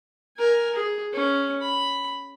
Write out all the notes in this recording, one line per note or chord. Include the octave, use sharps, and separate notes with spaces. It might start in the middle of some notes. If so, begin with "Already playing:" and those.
A#4 G#5
G#4
C#4
B5